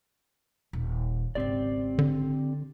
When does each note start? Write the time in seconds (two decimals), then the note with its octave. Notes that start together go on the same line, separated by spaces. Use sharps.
0.73 D#1
1.35 G#1 C#3 C4 G4 D5
1.99 D3